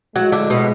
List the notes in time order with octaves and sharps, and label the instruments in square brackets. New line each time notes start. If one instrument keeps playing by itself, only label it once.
[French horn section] A2 F3 G#3 [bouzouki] F#3 F#4
[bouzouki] D3 D4
B2 B3